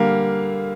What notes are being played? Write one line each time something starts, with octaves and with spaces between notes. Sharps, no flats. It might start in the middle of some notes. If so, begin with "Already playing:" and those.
Already playing: D3 G3 A#3 F5